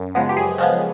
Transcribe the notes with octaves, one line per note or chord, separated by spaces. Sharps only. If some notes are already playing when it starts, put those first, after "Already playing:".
Already playing: F#2
C#3 F3 G#3 B3
G4
F#2 G#4
C#3 F3 G#3 B3